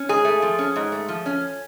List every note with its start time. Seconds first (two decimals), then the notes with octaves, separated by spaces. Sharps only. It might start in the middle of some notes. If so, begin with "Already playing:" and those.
Already playing: C#4
0.09 G#2 G#4
0.25 A3
0.42 F3
0.59 C#4
0.76 G#2
0.92 A3
1.09 F3
1.26 C#4